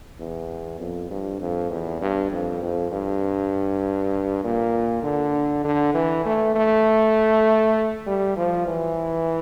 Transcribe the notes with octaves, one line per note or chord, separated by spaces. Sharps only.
E2
F2
G2
F2
E2
G2
F2
F2
G2
A#2
D3
D3
E3
A3
A3
G3
F3
E3